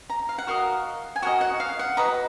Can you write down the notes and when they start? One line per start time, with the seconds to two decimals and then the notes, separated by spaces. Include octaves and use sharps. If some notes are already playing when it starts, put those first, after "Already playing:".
0.10 A#5
0.29 F5
0.38 F#5
0.47 F#4 A#4 D#5 F5
1.16 G#5
1.22 F#4 A#4 D#5 F#5
1.41 F#5
1.60 F5
1.79 F#5
1.97 F#4 B4 D#5 A#5